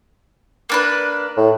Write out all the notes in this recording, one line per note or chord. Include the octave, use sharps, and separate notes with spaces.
A#3 D4 B4
A2